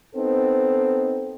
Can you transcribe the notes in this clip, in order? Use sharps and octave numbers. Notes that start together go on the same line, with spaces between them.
B3 C4 D#4 A4